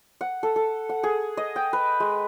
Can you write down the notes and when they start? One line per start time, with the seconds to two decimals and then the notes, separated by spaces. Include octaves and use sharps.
0.21 F#5
0.43 A4
0.56 A4
0.89 F#5
1.03 G#4
1.37 D#5
1.56 G5
1.73 B4
2.00 G#3